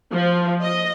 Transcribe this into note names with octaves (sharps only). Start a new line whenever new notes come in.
F3
D#5